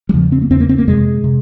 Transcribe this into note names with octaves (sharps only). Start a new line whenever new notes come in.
G3
E2 C#3 F3
C4
A#3
E2 C#3 C4
A#3
C4
A#3
F2 C3 G#3
C3